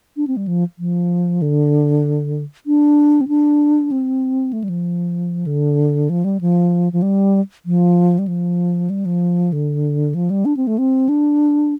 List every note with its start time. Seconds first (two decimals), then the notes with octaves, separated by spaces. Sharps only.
0.17 D4
0.27 C4
0.37 G3
0.47 F3
0.79 F3
1.42 D3
2.66 D4
3.21 C4
3.28 D4
3.91 C4
4.53 A3
4.64 G3
4.69 F3
5.47 D3
6.10 F3
6.24 G3
6.41 F3
6.93 F3
7.02 G3
7.66 F3
8.19 G3
8.28 F3
8.90 G3
9.05 F3
9.53 D3
10.15 F3
10.30 G3
10.45 D4
10.57 C4
10.67 A3
10.78 C4
11.09 D4